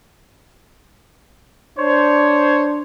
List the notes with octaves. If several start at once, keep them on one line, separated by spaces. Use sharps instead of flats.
D4 C5 C#5